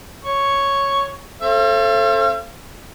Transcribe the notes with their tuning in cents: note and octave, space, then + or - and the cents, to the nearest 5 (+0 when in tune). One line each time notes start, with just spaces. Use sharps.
C#5 +0 C#6 +0
C4 +35 A4 +0 F5 -45